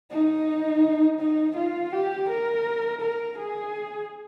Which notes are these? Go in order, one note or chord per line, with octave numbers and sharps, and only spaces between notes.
D#4
D#4
F4
G4
A#4
A#4
G#4